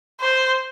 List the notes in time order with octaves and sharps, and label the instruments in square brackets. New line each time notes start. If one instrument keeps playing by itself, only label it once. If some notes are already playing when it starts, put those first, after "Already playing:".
[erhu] C5